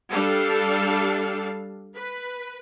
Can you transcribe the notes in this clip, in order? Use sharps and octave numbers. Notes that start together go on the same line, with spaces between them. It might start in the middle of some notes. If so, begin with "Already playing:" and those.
G3 D4 A4 F5 A5
B4